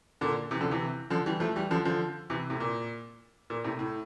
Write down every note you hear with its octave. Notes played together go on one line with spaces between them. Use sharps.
A#2 D3
C3 E3
D3 F3
C3 E3
D3 F3
E3 G3
F3 A3
E3 G3
D3 F3
D3 F3
C3 E3
A2 C3
A#2
A#2
A2 C3
A2